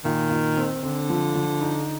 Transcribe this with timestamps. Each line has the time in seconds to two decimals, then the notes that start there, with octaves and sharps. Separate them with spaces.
0.04 A#2 D#3
0.31 A#2
0.57 C4
0.83 D3 C4
1.10 F3
1.35 F3
1.62 D#4